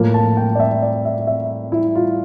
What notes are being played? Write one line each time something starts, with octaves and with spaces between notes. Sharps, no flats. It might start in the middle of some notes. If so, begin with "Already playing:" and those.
Already playing: A2 F3 A#3
A5
G5
D5
E5
D5
E5
E5
E4
F4